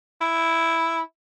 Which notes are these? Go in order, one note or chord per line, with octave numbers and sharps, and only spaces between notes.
E4